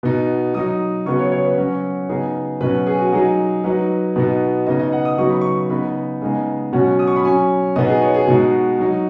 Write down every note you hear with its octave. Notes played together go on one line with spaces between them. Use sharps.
B2 B3 D#4
F#3 D#4 D#6
C#3 F#3 B3 C#6
C#5
C#5
B4
F#3 C#4 F#4
C#3 B3 D#4 G#4
B2 F#3 C#4 B4
G#4
F#4
F#3 D#4 G#4
F#3 D#4 B4
B2 B3 D#4
C#3 B3 D#4 D#5
D#5
F#5
D#6
C#3 F#3 B3 D#4 C#6
B5
C#6
C#3 B3 D#4 B5
C#3 G#3 B3 D#4 G#5
B2 F#3 C#4 F#5
D#6
C#6
B5
F#3 C#4 G#5
B2 B3 D#4 D#5
G#4
C#5
G#4
B2 G#3 D#4 F#4
F#3 D#4